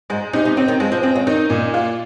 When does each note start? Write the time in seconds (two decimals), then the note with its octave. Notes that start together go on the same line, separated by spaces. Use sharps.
0.10 G#2 G#3
0.33 C3 D#4
0.45 C3
0.57 C#3 C4
0.68 D#3
0.80 F3 G#3
0.92 F3
1.03 F3 C4
1.15 C#3
1.27 D#3 D#4
1.50 A#2
1.74 F4